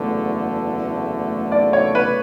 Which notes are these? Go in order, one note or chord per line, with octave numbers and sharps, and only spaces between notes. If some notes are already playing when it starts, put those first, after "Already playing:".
Already playing: F#1 E2 D3 A3
D5
C#5
B4